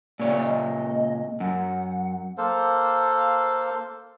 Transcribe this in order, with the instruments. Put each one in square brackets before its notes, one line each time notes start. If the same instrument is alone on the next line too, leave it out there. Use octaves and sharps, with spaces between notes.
[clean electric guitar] A#2 C#3 C#5 [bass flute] D5
[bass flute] D#5
[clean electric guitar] F#2 [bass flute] F#5
[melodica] A#3 A4 C5 F5